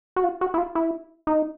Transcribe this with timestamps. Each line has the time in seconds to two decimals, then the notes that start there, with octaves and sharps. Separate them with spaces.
0.16 F#4
0.24 F4
0.41 F#4
0.54 E4
0.58 F4
0.75 E4
1.27 D#4